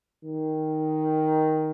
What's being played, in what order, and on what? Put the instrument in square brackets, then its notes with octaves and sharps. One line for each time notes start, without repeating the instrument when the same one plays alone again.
[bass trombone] D#3